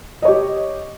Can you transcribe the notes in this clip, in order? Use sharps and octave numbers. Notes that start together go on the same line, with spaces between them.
G4 C#5 D#5